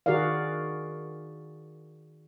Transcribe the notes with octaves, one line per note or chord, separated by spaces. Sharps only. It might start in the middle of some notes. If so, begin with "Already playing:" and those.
D#3 F#4 G#4 A#4 D5 F5